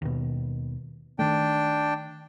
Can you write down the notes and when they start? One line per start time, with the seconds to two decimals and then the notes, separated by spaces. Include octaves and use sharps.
0.02 D#2 B2
1.19 D#3 A3 D4 G5